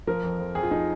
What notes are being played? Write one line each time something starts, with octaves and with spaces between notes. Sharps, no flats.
F3 A#4
F2
F2
F2 G#4
F4
F3 D#4